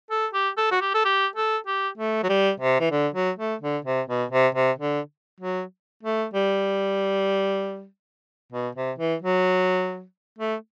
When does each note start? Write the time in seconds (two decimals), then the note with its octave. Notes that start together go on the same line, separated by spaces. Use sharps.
0.11 A4
0.34 G4
0.58 A4
0.72 F#4
0.82 G4
0.95 A4
1.05 G4
1.36 A4
1.67 G4
1.98 A3
2.24 F#3
2.29 G3
2.60 C3
2.80 E3
2.92 D3
3.15 F#3
3.39 A3
3.62 D3
3.85 C3
4.08 B2
4.31 C3
4.55 C3
4.79 D3
5.41 F#3
6.03 A3
6.34 G3
8.53 B2
8.75 C3
8.99 E3
9.22 F#3
10.39 A3